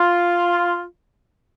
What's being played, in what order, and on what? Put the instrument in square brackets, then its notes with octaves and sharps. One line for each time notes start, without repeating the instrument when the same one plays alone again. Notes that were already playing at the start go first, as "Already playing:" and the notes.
Already playing: [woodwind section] F4